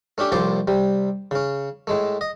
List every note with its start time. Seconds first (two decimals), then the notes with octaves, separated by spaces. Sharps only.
0.18 A3 C#4 D4 G4
0.32 C2 A2 F3 C5 D5 C#6
0.68 C3 G3
1.31 C#3 C#4
1.87 A2 G#3 A3
2.21 D#5